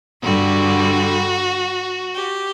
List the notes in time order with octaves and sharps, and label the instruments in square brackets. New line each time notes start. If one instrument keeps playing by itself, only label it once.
[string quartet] G2 D3 G3 F#4
G4